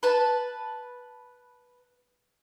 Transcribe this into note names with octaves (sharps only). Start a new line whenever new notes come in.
B4 A5